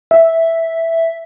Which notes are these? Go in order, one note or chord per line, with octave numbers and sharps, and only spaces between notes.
E5